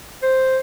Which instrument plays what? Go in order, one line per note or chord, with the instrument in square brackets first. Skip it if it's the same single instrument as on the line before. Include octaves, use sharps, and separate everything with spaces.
[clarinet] C5